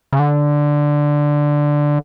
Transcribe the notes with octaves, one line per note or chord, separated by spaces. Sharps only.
C#3
D3